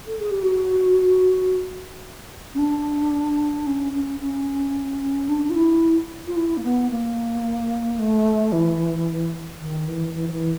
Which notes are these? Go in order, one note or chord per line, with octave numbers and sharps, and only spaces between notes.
A4
G#4
G4
F#4
C#4
D4
C#4
C#4
C#4
D4
F4
E4
F4
E4
A#3
B3
A#3
A3
E3
D#3
E3
E3
F3
E3